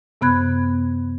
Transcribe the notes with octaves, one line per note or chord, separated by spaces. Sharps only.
F#2 C3 B3 B5 F#6 G#6